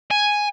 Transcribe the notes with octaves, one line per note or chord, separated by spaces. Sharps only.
G#5